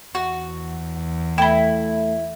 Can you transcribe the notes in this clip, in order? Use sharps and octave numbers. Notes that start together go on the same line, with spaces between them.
E2 F#4
A3 E4 G5 B5